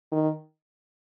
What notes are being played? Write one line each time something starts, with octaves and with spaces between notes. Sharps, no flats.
D#3